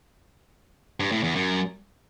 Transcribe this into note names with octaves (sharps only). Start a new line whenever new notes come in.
G2
A2
E2
F#2